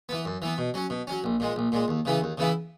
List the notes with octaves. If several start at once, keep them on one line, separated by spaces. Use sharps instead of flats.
E3 B3
F#2
E3 B3
B2
F#3 C#4
B2
F#3 C#4
A#1
A#2 G#3
A#1
A#2 G#3
D#2
C#3 E3 B3 E4
D#2
C#3 E3 B3 E4